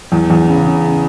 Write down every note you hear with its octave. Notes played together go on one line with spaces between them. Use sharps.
E2
E2
C#3
C#3